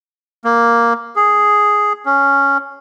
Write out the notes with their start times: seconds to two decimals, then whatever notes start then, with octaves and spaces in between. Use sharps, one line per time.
0.44 A#3
1.16 G#4
2.06 C#4